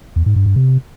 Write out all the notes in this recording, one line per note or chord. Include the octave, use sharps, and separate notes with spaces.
E2
G#2
G2
G2
C3